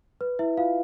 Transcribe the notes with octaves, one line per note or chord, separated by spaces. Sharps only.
B4
E4 E5
F4 F5